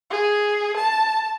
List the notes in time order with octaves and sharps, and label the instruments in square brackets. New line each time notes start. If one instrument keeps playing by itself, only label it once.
[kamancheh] G#4
A5